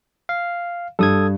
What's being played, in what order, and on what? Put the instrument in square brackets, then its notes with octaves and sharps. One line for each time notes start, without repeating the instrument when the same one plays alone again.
[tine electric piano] F5
[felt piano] G2 [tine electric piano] A4 D#6 G#6